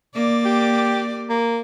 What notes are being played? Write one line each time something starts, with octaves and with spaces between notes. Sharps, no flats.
A#3 D5
G4
A#3